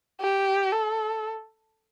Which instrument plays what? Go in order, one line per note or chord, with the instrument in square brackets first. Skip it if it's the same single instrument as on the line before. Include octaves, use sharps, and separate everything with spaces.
[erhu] G4
A4